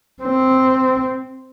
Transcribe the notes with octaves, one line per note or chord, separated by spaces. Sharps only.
C4